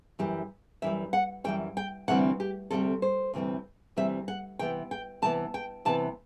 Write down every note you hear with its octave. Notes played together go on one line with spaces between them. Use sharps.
F#2 E3 G3 G4
F#2 E3 G3 E5
F#5
F#2 E3 G3 G5
G5
D2 C3 E3 G3 C4 F#5
G4
D2 C3 E3 G3 C4 A4
C5
D2 C3 E3 G3 C4
D2 C3 E3 G3 C4 E5
F#5
C3 E3 B3 G5
G5
C3 E3 B3 A5
G5
C3 E3 B3 A5